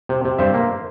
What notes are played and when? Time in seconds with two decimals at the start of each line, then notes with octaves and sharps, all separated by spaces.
0.09 C3
0.25 C3
0.38 G2 C5 E5
0.54 A#3